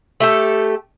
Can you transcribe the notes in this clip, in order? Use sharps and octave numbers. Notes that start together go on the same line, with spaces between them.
A3 G4 A4